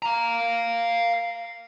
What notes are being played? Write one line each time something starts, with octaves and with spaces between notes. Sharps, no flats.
F5 A#5